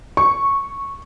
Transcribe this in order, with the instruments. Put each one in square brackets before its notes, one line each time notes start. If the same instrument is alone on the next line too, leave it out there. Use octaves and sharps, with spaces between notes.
[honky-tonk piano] C#6